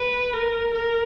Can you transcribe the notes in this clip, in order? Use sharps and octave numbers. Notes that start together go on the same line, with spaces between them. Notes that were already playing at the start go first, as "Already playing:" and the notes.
Already playing: B4
A#4
A#4